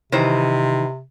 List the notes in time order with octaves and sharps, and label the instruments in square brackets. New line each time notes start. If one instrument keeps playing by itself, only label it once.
[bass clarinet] C3 [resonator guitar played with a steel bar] D#3 E3 C5